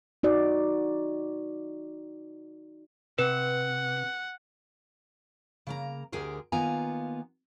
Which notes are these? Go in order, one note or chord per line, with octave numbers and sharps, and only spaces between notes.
D#4 F#4 D5
C3 B4 F#5
C#3 A#3 A#5
D2 D3 G4 G#4 A#4 C5
D#3 A#3 B3 F4 G#5 A#5